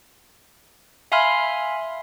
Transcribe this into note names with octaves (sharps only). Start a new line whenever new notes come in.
E5 F5 G#5 B5 C6 F6